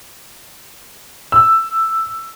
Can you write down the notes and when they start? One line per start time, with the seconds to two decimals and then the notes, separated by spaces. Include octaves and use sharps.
1.32 E6